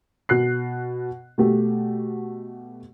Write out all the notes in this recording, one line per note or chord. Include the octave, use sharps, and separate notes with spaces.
B2 F#6 C7
B2 A3 G4